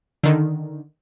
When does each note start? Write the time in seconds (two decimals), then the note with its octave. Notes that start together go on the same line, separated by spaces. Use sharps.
0.23 D3 D#3